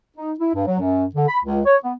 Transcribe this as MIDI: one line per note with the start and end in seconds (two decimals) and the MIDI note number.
0.17 0.32 63
0.39 0.51 64
0.54 0.65 43
0.66 0.78 54
0.79 1.05 42
1.15 1.27 50
1.28 1.38 83
1.44 1.61 37
1.65 1.77 73
1.83 1.93 59